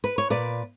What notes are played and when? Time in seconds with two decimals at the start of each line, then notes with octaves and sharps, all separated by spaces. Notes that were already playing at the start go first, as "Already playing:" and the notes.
0.04 B4
0.18 C#5
0.30 A#2 B4 D5